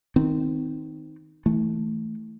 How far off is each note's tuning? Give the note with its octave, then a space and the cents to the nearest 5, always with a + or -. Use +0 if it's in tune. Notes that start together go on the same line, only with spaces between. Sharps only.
D#3 +0 C4 -15
E3 -25 A3 +0